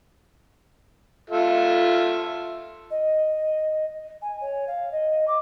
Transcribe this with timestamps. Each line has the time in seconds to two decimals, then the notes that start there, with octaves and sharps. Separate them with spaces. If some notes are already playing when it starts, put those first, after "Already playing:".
1.30 F4 A4 E5
2.90 D#5
4.22 G#5
4.41 C#5
4.67 F5
4.92 D#5
5.28 D6